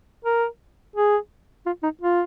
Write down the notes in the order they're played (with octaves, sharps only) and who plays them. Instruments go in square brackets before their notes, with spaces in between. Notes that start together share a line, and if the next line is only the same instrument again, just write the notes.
[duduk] A#4
G#4
F4
D#4
F4